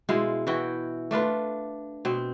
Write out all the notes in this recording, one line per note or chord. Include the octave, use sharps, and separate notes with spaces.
B2 G#3 E4 F4
E3 E4 F#4 G5
A3 D4 F4 B4
B2 C4